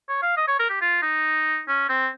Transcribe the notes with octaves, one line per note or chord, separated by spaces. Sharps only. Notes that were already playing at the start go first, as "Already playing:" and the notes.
C#5
F5
D#5
C#5
A#4
G4
F4
D#4
C#4
C4